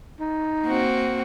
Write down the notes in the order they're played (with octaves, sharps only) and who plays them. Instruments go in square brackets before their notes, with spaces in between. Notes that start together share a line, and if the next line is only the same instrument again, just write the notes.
[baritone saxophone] D#4
[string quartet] A#3 C4 F#4